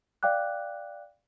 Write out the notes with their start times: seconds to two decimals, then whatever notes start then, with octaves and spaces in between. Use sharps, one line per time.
0.23 D5 F5 G5 D6 F#6